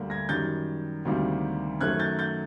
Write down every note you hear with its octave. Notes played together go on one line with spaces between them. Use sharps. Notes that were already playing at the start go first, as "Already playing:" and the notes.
Already playing: D2 D3 G3 A#3
G#6 A#6
F#2 D#3 G3 G6 A6
D2 C3 D#3 G3 A#3
F#2 D#3 F#3 A3 F#6 G#6
G6 A6
G6 A6